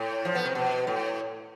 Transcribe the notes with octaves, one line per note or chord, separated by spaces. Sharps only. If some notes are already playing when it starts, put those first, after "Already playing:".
Already playing: A2
F3
B3
C3
B2
A2